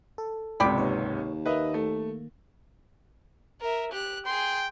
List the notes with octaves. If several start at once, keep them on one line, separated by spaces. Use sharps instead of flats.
A4
G#1 C#2 C3 D5 G5 B5
D#2 B4 C#5
D#3 A#3 B4 D#5 E5
A3
A#4 E5
G4 F#6
G#4 G5 C6